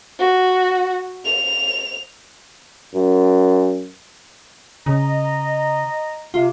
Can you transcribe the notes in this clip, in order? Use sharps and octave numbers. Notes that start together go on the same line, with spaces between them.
F#4
F7
F#2
C#3 D#5 A#5
C3 F4